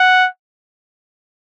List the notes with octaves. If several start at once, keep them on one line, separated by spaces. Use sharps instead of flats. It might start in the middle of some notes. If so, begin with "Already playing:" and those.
Already playing: F#5